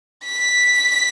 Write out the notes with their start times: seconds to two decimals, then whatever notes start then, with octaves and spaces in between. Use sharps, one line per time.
0.25 B6